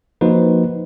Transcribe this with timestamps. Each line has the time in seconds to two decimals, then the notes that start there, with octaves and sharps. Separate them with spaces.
0.21 F3 A#3 D#4 F#4 B4 C5